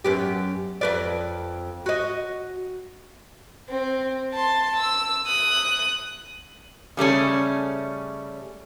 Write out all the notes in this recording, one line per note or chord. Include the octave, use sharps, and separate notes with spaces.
F#2 B3 G4
F2 B4 D5
F#4 D#5
C4
A5 C6
E6
D#6 F#6
C#3 G3 A3 C#4